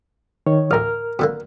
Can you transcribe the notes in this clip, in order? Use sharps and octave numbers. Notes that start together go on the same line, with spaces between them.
D#3 C#5
A1 D2 A#4 F6
B2 D3 A#3